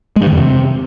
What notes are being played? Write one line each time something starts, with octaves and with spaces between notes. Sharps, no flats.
G#3
G2
D#3
F2
C3